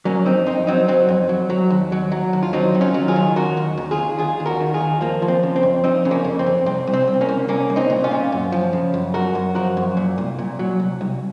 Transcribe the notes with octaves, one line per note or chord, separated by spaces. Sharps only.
F#3 A#3 C#4
F2 C4 D#4
F2 C4 D#4
F#3 C4 D#4
F#3 C4
F2
F#3
F#3
D#2
F#3
F#3
D#2
F4
F#3 C4 D#4
D#3
C#4 F4
F#3
F4 G#4
D#3
D#2 F#4 A#4
D#2
D#2
F4 G#4
D#2
D#2 F4 G#4
D#2
F#4 A#4
D#3
F4 G#4
D#2
F3 A#3
F3
C4
C#3
C4
F2
F3 C4 D#4
C#3
A#3 C#4
F2
C4
F2
C2 C4
C2
C4
C2
A#3 C#4
C2
C2 A#3 C#4
C2
C4 D#4
A#2
C#4 F4
A#2
F#2
F3
C#3
F#2
F#2 F#4 A#4
F#2
F3 F#4 A#4
F#2
A#2
C2
A#2
F#3
C2
C2